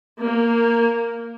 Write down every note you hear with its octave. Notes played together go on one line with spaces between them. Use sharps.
A#3